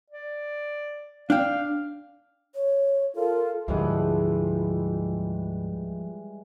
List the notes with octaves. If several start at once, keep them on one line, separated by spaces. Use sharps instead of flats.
D5
D4 F5 G5
C#5
F4 A4 A#4
D2 G#2 D3 E3 F3 G3 G#3